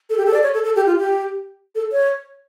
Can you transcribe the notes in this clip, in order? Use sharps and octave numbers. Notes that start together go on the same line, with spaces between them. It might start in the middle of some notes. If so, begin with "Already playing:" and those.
A4
G4
A4
D5
C#5
A4
A4
G4
F4
G4
A4
C#5